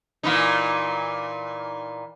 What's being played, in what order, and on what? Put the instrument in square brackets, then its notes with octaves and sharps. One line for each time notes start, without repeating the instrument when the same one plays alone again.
[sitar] A#2 E3 D#4